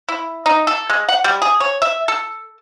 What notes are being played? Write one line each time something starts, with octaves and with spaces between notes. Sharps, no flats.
E4
D#4
A4
G#3
F#5
G3
G#4
C#5
E5
A4